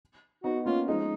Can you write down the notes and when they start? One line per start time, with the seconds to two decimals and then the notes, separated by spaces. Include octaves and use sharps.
0.44 B3 D#4 F#4
0.66 A#3 C#4 F4
0.87 F3 G#3 D#4